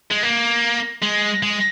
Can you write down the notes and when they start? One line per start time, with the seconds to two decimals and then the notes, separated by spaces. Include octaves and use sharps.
0.11 G#3
0.23 A#3
1.03 G#3
1.43 G#3